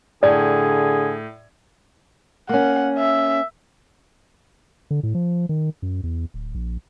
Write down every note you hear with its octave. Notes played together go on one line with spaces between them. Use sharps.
A2 D3 G#4 D5 G#6
A#3 C#4 F#5
E5
D3
A2
F3
D#3
F#2
E2
D1
A#1